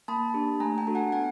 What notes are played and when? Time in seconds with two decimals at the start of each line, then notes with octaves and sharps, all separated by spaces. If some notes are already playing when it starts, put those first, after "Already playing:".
0.08 A#3 A5 B5
0.34 D4 G4
0.60 A3 G#5 A#5
0.78 G5 A5
0.86 D4 F#4 A4
0.95 F#5 G#5
1.12 B3 F#5 G#5